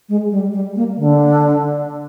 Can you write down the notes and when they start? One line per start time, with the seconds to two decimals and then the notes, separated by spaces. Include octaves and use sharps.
0.09 G#3
0.31 G3
0.53 G3
0.76 A#3
0.98 D3